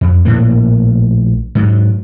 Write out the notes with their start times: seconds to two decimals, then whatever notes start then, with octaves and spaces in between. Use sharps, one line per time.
0.01 F2
0.25 A#1 A2 A#3
1.55 G#2 F#3